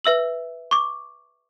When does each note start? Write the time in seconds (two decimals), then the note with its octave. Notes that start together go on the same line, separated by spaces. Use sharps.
0.04 B4 E5 E6 F#7
0.71 C#6 D6